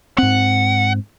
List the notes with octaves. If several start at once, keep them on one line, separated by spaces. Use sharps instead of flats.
G#2 C4 F#5